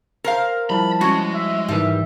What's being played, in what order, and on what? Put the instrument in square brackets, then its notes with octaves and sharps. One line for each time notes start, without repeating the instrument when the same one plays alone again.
[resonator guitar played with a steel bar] A#4 C5 F5
[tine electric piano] F3 G3 E4 [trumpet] A5 [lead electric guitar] B5
[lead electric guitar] G#3 [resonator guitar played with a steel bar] C#4 F#4
[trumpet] E5
[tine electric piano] G#2 D#3 E3 [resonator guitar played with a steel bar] G3 [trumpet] E5